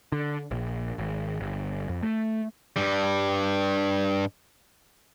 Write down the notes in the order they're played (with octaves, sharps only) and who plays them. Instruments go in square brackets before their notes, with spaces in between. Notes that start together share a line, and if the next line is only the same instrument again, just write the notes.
[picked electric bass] D3
A#1
G#1
G1
F2
A3
[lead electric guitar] G2 G3